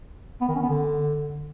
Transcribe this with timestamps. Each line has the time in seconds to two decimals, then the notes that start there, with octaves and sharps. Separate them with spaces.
0.41 B3
0.48 D#3
0.55 C#4
0.62 B3
0.69 D3